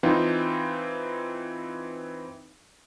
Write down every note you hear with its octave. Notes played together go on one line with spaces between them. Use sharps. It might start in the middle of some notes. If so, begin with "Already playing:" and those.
E3 C4 D#4 F4